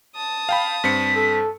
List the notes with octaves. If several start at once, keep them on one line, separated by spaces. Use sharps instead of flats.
A5 D#6
F5 G5 B5
G2 C4 B6 C#7
A4